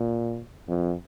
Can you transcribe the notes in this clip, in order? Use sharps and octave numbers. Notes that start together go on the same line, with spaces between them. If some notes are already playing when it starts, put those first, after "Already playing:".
Already playing: A#2
F2